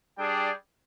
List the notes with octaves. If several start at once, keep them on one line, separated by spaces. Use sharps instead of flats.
G3 D4 G#4 D5 G5